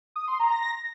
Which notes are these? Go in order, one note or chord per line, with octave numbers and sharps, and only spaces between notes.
D#6
C6
A#5
A#6